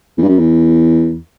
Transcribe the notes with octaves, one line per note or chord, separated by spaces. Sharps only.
E2
G2
F#2
E2